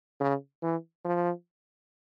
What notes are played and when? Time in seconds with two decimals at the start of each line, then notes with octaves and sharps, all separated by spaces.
0.21 C#3
0.62 E3
1.05 F3